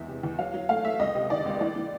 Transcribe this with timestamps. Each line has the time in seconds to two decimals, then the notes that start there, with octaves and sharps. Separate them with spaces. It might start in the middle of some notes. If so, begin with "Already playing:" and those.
Already playing: E2 G#3 E5
0.08 C3
0.23 E2
0.39 F#3 F5
0.54 F#3
0.69 A3 F5
0.84 A3 E5
0.99 C#2 D#5
1.15 C3
1.30 D#3 D5
1.46 C#2
1.61 E3 D5
1.76 E3